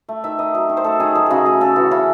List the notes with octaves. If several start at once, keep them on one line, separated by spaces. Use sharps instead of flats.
A3
D#3 E5
D#3 D#5
F#3
D#3
C5
A3 A4
D#3 G#4
F#3 A4
C#3 F#4 G#4
A3 G#4
C#3 A4
E3 F#4
C#3 C#4